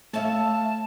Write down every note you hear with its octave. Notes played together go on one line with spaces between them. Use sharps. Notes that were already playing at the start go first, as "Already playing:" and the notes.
A3 C#5 E5 F5 A5